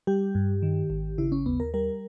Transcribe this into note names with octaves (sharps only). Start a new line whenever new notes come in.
G3 G4
G2
D#3
G#1
C#3 E4
C#4
D#2 B3
A#4
G3 A#4